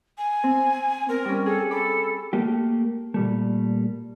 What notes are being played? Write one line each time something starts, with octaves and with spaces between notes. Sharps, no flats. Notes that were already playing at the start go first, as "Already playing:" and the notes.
G#5
C4
C4 A#4
G3 C#4
G#4 A4
A4 B5 D6
A3 A#3 G4
A#2 G3 A3